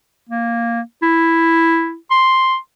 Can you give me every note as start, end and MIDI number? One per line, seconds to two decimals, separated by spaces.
0.30 0.81 58
1.03 1.95 64
2.11 2.57 84